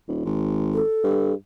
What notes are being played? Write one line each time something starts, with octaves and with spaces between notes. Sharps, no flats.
D#1
G#1
A4
G2